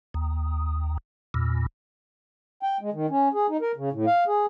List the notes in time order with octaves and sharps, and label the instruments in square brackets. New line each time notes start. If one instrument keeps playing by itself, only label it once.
[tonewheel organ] D#2
E2 A#2
[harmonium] G5
G#3
D#3
C#4
G#4
D#4
A#4
C#3
A2
F5
G#4